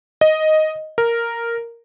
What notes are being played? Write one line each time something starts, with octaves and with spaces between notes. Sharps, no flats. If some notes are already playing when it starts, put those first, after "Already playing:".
D#5
A#4